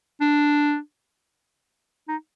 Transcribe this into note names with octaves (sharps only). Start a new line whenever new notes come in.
D4
D#4